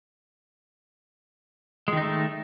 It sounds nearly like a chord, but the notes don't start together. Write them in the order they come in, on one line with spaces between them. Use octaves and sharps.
G#3 D#3 D#4 A3